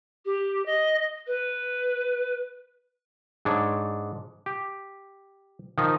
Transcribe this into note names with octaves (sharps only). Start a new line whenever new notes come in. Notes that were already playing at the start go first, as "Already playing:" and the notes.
G4
D#5
B4
G#2 D4 C#5
G4
D#3 F3 D#4 D#5